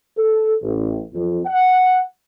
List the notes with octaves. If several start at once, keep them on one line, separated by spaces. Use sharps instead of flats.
A4
A1
F2
F#5